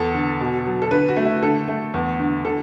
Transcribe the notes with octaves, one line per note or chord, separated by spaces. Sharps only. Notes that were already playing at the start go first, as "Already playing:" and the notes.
Already playing: E2 A4
D3
B2
F#3
A4
D3 B4
F#4
A3
E4
D3 A4
A3
E2
D3
D3 A4